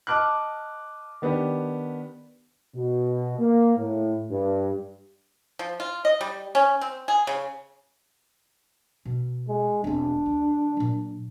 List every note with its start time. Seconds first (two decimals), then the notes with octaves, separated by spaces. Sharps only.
0.07 D#5 A5 D6 F6 F#6
1.22 D#3 B3 D4 G4
2.74 B2
3.39 A#3
3.77 A2
4.30 G2
5.59 F3
5.80 F4
6.05 D#5
6.21 G3
6.55 C#4
6.81 C4
7.08 G#4
7.27 C#3
9.05 B2
9.48 G#3
9.84 E1 C4 D4
10.26 D2
10.77 A#2 F#3